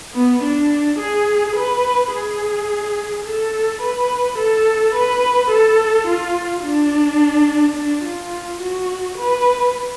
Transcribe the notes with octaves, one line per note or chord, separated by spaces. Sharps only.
B3
D4
G#4
B4
G#4
A4
B4
A4
B4
A4
F4
D4
D4
F4
F#4
B4